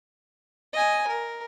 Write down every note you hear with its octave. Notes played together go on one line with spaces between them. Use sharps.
D#5 G#5
A#4